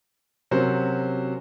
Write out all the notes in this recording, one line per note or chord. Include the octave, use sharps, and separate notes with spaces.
C3 F#3 C#4 F#4 A#4 C5